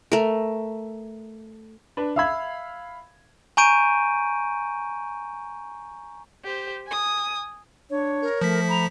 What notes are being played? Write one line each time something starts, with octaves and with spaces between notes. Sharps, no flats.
A3 A#4
D4 B4
E5 F5 B5 E6 G#6
G#5 A#5 C#6 G6 D7 D#7
G4 C5
G#5 D#6
D4 C#5
A#4
F3 A3 B6
A#5 B5